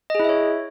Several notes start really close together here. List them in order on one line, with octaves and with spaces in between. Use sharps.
D#5 G#4 E4 E5 C#5